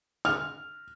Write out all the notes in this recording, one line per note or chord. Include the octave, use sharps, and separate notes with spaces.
F6